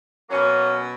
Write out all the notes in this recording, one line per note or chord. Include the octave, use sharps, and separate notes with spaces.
B2 F#3 A#3 C#4